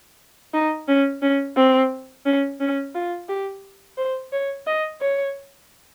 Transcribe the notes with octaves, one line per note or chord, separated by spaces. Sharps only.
D#4
C#4
C#4
C4
C#4
C#4
F4
G4
C5
C#5
D#5
C#5